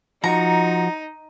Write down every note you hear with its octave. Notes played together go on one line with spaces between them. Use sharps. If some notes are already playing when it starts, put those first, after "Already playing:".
F3 D#4 F#4 A#5